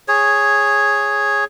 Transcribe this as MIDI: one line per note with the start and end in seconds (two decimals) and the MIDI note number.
0.08 1.44 68
0.08 1.44 73